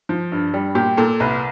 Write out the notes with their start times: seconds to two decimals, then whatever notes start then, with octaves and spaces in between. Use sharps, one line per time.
0.09 F3
0.32 G2
0.54 G3
0.75 A#2 G4
0.97 A#2 A4
1.20 C2 B4